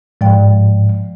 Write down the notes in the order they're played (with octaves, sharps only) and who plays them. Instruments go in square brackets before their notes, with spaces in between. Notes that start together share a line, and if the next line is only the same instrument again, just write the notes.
[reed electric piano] G#2 [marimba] F3 D5 G5